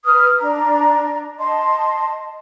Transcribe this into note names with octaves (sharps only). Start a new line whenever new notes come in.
B4 D#6 F6
D4 A#5
D#5 A5 C6